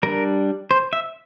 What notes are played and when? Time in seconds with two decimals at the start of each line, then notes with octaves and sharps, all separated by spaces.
0.03 G3 D4 A#4
0.71 C5
0.93 E5